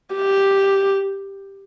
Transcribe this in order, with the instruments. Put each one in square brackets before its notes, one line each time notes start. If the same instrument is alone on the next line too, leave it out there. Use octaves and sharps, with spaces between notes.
[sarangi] G4